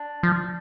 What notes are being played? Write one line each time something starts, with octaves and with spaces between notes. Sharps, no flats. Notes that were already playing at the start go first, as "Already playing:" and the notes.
Already playing: D4
F3